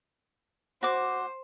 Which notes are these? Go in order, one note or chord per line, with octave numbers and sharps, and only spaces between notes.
F#4 C5 D6